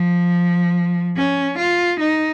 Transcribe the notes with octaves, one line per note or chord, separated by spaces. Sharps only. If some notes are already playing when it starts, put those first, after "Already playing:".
Already playing: F3
C#4
F4
D#4